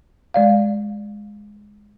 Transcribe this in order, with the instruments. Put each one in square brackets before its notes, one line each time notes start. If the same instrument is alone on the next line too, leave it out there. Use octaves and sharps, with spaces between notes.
[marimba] G#3 D5 F5